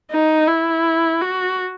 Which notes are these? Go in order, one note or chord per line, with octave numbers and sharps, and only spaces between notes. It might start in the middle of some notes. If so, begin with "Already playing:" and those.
D#4
E4
F#4